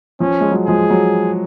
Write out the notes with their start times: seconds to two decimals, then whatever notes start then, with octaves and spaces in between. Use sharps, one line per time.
0.20 F3 C#4
0.40 G#3
0.52 F#3
0.67 F3 G#3 G#4
0.90 F#3